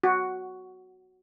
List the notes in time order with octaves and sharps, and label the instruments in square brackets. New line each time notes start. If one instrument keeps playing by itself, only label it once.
[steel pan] F#4